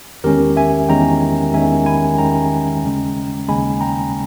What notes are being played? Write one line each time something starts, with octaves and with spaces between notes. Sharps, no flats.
E2 D#3 G#3 C#4 G4 A#4
E5 G#5
E2 D#3 G#3 C#4 G5 A#5
E2 D#3 G#3 C#4 E5 G#5
G#5 B5
E2 D#3 G#3 C#4 G5 A#5
D#2 C#3 G#3 C#4
D#2 C#3 G#3 C#4 G#5 B5
G5 A#5